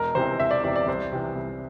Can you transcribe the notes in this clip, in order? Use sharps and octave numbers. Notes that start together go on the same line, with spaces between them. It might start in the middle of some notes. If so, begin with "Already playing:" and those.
Already playing: E1 A#4
E2 C3 E3 C5
E1 E5
D5
E2 C3 E3 D5
D5
C2 C5
C3 E3
C2